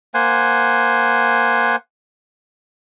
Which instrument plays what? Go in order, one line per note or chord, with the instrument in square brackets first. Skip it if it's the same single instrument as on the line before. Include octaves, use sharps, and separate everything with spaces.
[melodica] A#3 C5 F#5 G#5